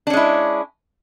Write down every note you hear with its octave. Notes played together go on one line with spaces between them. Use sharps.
G#3 C#4 D4 E4